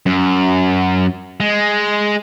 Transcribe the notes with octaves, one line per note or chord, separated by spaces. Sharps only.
F#2
G#3